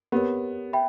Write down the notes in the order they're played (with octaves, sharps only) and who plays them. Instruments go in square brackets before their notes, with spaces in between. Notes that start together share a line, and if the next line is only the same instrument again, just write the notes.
[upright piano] B3 [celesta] G4 A#4 C#5
[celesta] E5 G5 B5